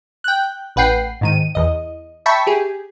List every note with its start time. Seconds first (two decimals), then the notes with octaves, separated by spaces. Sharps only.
0.24 G5 F#6
0.76 A1 B4 F#5 G5 C7
1.21 G#2 D#3 D#7
1.55 E2 D#5
2.26 E5 G5 A5 B5 C#6 B6
2.47 G4 G#4